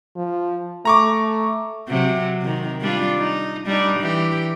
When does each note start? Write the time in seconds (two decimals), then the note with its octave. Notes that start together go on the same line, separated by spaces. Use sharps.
0.16 F3
0.85 A3 A#5 C#6 D6
1.89 C3 F#3
2.41 C3 D#3
2.81 G3 D4 F4
3.19 D#4
3.66 G3 D4 D#4
4.00 E3 G4